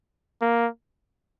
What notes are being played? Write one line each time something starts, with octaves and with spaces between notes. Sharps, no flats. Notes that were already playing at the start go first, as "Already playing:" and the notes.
A#3